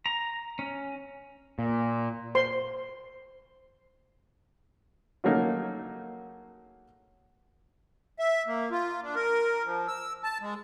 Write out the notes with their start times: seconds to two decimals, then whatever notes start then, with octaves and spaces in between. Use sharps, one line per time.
0.06 A#5
0.59 C#4
1.59 A#2
2.35 C5 C6
5.24 C#3 F#3 A3 A#3 D#4
8.19 E5
8.47 A#3
8.71 F4
9.02 D4
9.15 A#4
9.65 F3
9.88 E6
10.23 A5
10.41 G#3